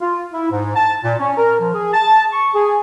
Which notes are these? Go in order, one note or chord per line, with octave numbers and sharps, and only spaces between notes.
F4
E4
G#2
A5
A#2
C#4
A#4
F3
G#4
A5
C#6
G#4